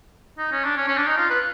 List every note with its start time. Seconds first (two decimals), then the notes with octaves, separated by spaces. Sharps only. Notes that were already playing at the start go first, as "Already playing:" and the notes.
0.38 D#4
0.52 C#4
0.64 D4
0.78 C#4
0.88 C#4
0.97 D4
1.07 D#4
1.17 F4
1.30 B4